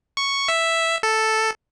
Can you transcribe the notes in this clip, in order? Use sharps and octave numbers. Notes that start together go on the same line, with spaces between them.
C#6
E5
A4